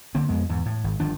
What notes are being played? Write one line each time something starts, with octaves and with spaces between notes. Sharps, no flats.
D2 D3 A#3 C4
F2 G#3 B3
E2 G#2
A2
G#1
G1 D#3 F3 D4